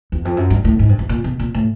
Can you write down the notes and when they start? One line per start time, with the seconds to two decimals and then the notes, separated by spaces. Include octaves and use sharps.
0.12 E2
0.25 F2
0.37 F#2
0.50 G2
0.65 A2
0.79 G#2
0.89 G2
0.99 G#2
1.09 A#2
1.24 B2
1.40 A#2
1.54 A2